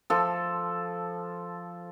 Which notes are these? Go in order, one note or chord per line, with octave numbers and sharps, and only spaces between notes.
F3 A4